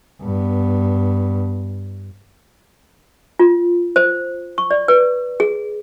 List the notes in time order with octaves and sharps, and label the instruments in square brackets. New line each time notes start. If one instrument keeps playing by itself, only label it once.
[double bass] G2 B3
[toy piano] F4
C5
C#6
D5
B4
G#4